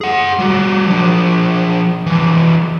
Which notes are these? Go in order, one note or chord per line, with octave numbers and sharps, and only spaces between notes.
G#4 F#5
G3 F#4
F3 D4
E3 D4